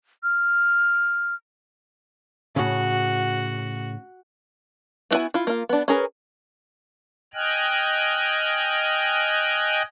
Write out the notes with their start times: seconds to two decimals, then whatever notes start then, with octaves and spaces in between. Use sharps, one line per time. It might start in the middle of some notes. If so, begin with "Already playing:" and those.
0.23 F6
2.56 A2 C#3 F#4
5.11 B3 C4 E4 F#4 G#5
5.34 E4 F4
5.47 A#3 F4
5.69 B3 D4
5.88 C#4 G#4 A#4 B4
7.34 D#5 G5 G#5 F6 F#6